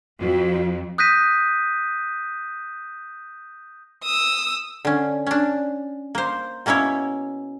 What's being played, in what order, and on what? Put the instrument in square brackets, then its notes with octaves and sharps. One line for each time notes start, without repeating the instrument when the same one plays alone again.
[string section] F2 [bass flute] F#4
[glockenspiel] D#6 F#6 G6 A#6 B6 D#7
[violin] D#6 E6
[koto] D3 C#4
C#4 D4
A#3 C5
B2 A#3 C#4 E4 C#5